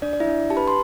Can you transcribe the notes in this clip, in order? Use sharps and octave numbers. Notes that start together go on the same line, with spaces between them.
D4 D5
D5
E4 E5
D4
G4 A5
B4 B5
C6